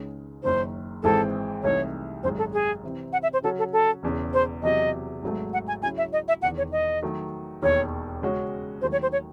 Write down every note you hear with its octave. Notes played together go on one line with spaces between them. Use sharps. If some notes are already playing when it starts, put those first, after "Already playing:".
Already playing: C#2 C#3 G#3 D#4
F#1 F#2 D#3 C5
G#1 G#2 E3 G#3 C4 A4
C2 C3 E3 A3 D#4 C#5
G#1 F#2 D#3 G#3 C5
A4
G#4
C3 E3 C4
F#5
E5
C5
C#3 F#3 C#4 F#4 A4 C#5
A4
A4
E1 E2 C#3
C5
E2 C3 F#3 D#5
G#1 G#2 F#3 A3
F#5
G#5
C#2 C#3 F#3 C#4 E4 G#5
E5
D#5
E5
E1 E2 D#3 F#5
C#5
D#5
D#3 F#3 A3
E1 D#2 D#3 C#5
C#3 G#3 C#4 F#4 C#5
D#2 D#3 F#3 A3 C5
C#5
C5
C#5